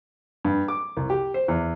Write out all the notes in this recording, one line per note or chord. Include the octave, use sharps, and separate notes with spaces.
G2
D6
C2
G4
C5
E2